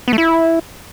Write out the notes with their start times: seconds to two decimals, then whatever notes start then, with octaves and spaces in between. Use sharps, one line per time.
0.08 B3
0.13 A3
0.18 E4